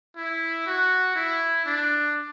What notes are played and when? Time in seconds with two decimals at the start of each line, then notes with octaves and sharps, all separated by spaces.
0.17 E4
0.66 F#4
1.16 E4
1.65 D4